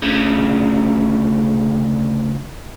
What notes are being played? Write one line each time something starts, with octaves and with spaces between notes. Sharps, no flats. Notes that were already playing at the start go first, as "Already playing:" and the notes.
D2 C#3